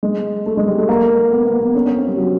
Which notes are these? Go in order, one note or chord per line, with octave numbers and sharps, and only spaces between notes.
G#3
A3
G#3
G3
A3
A#3
B3
B3
B3
C#4
C#4
C4
G3
F#3